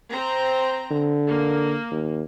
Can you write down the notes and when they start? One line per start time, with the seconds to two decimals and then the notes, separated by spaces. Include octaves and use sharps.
0.11 C4 A#5
0.91 D3
1.28 A#3
1.91 D#2